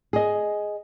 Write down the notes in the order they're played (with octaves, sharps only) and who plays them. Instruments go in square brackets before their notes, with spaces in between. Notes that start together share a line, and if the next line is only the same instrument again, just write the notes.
[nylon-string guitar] G#4 D#5